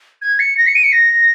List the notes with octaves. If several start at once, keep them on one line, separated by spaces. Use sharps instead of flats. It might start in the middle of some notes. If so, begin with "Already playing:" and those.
G#6
C#7
A#6
C#7
D#7
C#7
A#6